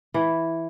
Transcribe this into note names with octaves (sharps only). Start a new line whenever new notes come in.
E3